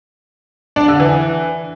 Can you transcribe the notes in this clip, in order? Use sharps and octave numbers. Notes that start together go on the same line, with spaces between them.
D4
D3
E3